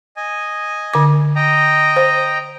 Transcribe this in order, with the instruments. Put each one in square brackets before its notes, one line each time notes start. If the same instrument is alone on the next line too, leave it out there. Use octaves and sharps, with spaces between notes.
[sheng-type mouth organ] D#5 G#5
[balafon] D3 D6
[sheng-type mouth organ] D#5 G5 A#5
[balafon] C5